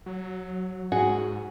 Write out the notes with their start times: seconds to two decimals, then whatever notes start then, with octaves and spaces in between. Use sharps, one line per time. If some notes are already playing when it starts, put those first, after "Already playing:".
0.06 F#3
0.92 G#2 F#4 G#4